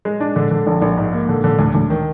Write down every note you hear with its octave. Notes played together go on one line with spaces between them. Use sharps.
G#3
D4
D3
D3
A#1
A#1
G#2
A#3
D3
D3
D2
D2
D#3